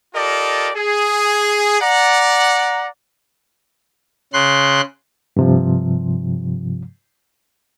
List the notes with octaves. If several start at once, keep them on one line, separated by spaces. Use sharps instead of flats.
F4 G4 A4 A#4 D5 D#5
G#4
D5 F#5 A#5
C#3 C6 F#6
G2 C3 F3